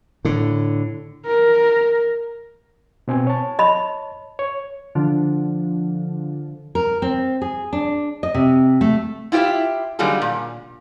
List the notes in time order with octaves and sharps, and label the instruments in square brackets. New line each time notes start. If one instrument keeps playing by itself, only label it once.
[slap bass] A2 D3
[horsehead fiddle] A#4
[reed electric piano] B2 C4 G#5
C#5 A5
[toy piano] D#5 B5
[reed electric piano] C#5
[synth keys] D3 F3
[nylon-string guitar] A#4
C4
G#4
D4
D#5
C3
A3
[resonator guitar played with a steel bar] E4 F4 G4 C5 E5
D3 F#3 G3 A#3 D#4 G#4
A#2